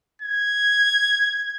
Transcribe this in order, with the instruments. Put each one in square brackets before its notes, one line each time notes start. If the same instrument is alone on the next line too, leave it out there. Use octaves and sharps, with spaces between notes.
[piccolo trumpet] G#6